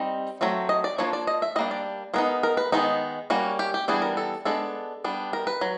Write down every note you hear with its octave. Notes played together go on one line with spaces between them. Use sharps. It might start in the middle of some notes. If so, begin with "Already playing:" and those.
Already playing: G3 C4 D#4
F#3 A3 C4
D#5
D5
F3 A#3 D4 C#5
D5
D#5
E5
G3 A#3 D4 D#5
D5
G#3 B3 D#4 A#4
A#4
B4
D#3 G#3 B3 D#4
G3 A#3 C#4 F#4
G4
G4
E3 G3 B3 D4 G#4
A#4
A4
G#3 B3 D4 A4
G3 B3 D4
A#4
B4
F#3